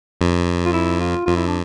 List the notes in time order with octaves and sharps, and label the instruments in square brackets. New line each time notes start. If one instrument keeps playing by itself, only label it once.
[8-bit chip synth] F2
[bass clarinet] F4
E4
F4
[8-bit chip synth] F2 [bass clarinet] F4
[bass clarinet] E4
D4